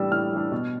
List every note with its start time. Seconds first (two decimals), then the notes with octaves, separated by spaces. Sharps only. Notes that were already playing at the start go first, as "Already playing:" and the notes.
Already playing: A2 E3 G3 D4 E6
0.11 A2 F6
0.32 E3 G3 D4
0.52 B2